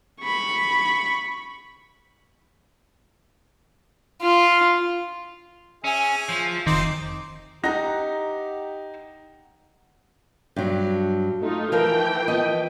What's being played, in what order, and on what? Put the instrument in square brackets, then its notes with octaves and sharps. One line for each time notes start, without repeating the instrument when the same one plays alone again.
[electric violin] B5 C#6
[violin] F4
[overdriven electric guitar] C#4 [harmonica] G#4 E5 G#5
[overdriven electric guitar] F3
[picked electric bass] F1 D#3 [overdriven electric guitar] C4 [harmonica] D#4 C6 D6
[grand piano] D#4 A#6 [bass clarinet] G4 [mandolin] F#5 A#5
[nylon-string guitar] G2 F#3
[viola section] A3 D#4 F4
[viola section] E3 G5 [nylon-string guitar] F3 A#4 F5
[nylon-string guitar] F3 B3 D#5